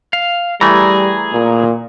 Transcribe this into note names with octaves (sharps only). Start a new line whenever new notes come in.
F5
E3 G3 A3 G#4 A#5
A#2